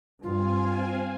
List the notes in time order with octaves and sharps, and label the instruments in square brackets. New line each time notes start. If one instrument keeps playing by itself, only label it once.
[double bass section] G2 [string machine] C4 F5 G#5 [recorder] F4